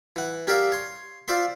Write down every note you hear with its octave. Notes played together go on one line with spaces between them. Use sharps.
E3 F#5
C#4 G4 A#4 D5 E5 F5
C#5 C6
F4 C5 D5 E5 C6